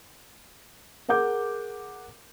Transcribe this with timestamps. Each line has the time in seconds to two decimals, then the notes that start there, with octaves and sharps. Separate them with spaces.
1.08 G#4 A#4 F#5 D6 G6